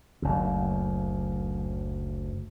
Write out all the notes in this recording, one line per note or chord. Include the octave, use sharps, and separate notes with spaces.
F#1 D2